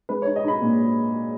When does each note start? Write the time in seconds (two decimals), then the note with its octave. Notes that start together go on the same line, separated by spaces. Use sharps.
0.09 G#3 B4
0.22 D#4 C#5
0.36 D#5
0.44 D#4 B5
0.62 A#2